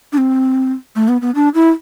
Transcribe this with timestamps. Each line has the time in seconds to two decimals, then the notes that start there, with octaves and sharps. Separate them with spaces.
0.13 D4
0.18 C4
0.96 A3
1.08 B3
1.22 B3
1.35 D4
1.55 E4